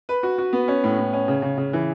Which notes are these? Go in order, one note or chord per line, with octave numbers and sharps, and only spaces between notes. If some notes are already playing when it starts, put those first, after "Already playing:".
B4
F#4
F#4
B3
C#4
A2
A2
C#4
C#3
C#3
C#3
E3